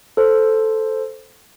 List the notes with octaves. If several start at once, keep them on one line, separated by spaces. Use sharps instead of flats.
A4 C5